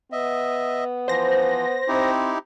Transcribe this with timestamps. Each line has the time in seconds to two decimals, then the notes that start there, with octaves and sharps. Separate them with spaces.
0.12 B3 D#5 E5
1.08 E3 F3 C5 A#6
1.88 C4 D#4 E4 G4